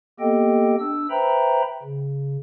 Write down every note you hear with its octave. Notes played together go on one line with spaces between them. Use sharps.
A#3 B3 G4 A4 D#5 G5
D4 E6
B4 C5 E5 G5 A#5 B5
C#3